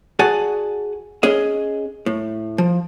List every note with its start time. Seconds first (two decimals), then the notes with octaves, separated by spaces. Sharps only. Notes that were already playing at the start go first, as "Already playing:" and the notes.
0.19 F#4 G#4 D5 F#5 G#5 A5
1.23 C#4 G#4 D#5
2.06 A2
2.58 F3